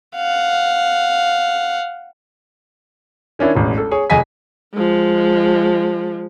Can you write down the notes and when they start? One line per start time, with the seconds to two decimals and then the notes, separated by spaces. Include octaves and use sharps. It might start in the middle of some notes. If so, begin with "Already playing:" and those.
0.16 F5 F#5
3.39 D#3 C#4 D4 E4
3.55 E1 A1
3.78 A4
3.91 G#4 C#5
4.10 F1 G#4 D#5 G#5 B6
4.73 F3 G#3